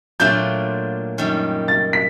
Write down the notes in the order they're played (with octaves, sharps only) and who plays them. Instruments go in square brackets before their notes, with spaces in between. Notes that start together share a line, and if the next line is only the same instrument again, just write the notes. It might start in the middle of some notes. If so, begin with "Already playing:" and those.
[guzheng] A#2 F#3 A3 D4 F4 [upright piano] G6
[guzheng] F#2 D#3 G3
[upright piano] A6
B6